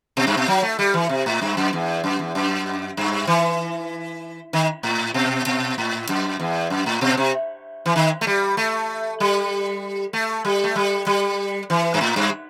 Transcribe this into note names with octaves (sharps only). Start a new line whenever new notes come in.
B2
G2
B2
F#3
A3
G3
E3
C3
A2
G2
F#2
E2
F#2
E2
F#2
G2
E3
D#3
A2
B2
B2
A2
F#2
E2
F#2
A2
B2
C3
E3
D#3
A3
G3
A3
G3
A3
G3
A3
G3
G3
E3
G2
A2
G2